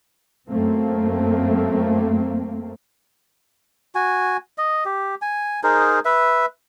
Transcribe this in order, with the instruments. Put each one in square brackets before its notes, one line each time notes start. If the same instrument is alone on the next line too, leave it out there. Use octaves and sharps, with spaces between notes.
[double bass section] F#2 A3 A#3 C4
[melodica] F#4 G#5
D#5
G4
G#5
D#4 G#4 A#4 C5
B4 E5